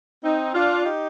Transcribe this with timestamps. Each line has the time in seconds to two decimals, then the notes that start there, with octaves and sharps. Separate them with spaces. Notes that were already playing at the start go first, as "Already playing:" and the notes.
0.24 C4 D#4
0.54 D4 F4
0.84 D#4 G4